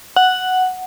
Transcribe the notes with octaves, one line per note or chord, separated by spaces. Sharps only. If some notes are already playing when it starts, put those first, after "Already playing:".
F#5